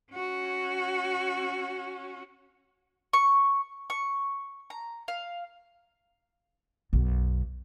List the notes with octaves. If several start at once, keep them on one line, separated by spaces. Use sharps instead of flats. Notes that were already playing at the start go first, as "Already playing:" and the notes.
C#4 F#4
C#6
C#6
A#5
F5
B1 F#2